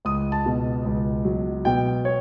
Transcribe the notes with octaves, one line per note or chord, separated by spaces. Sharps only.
C#2 D#6
A5
B2
C#2
F#3
B2 G5
C#5